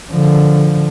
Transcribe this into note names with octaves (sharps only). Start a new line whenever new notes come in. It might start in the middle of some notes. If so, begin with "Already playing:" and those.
D3 F3